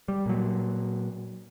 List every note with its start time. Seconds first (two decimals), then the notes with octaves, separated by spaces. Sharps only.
0.08 G3
0.26 A#2 F#3